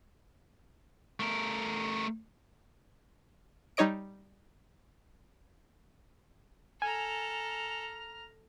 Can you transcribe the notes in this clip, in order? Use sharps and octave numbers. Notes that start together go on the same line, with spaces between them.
A3 A#4
G3 D#4 C#5 D#5 D7
A4 G#5 A#5 F6